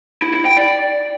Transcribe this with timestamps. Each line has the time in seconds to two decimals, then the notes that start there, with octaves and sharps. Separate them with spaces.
0.22 E4
0.34 E4
0.45 G5
0.57 D5